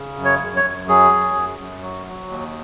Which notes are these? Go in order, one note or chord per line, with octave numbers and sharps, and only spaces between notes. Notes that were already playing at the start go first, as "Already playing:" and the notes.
Already playing: C#3
F#2
C#5
F#2
C#5
F#2
F#3 G#4
F#2
F#2
F#2
F#3
F#3
D#2